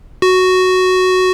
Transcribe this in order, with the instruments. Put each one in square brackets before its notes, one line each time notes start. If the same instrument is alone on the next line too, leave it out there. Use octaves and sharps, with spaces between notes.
[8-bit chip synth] F#4